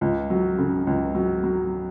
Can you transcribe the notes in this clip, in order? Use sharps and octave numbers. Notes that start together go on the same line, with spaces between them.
C#2
F#3
C#3
C#2
F#3
F#3